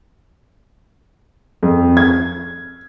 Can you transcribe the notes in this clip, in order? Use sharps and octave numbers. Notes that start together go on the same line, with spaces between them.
F2
G#6